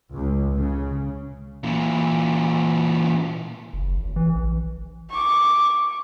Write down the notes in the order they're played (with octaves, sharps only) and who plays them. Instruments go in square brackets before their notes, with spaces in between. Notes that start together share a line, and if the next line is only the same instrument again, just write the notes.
[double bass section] C#2
C#3
[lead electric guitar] A#2 E3
[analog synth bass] F#1
G#1
E3
A#1
[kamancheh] C#6 D6